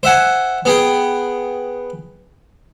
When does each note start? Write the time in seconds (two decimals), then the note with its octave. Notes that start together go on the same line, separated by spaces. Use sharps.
0.03 C5 E5 F#5 G#5
0.65 B3 G#4 G5